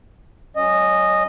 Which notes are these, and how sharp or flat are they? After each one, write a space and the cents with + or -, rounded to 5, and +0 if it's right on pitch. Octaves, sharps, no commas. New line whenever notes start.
F#3 +30 C#4 +0 D#5 -10